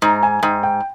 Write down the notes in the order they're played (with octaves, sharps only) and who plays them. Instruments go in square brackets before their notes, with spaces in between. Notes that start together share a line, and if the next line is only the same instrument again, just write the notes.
[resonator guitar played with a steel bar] G#2 [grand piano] A#5
[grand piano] G#5
[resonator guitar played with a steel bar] G#2 [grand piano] G5
[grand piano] G5